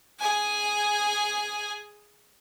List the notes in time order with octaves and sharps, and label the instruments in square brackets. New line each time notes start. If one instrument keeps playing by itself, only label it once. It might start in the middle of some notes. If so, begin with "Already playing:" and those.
[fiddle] G#4 G#5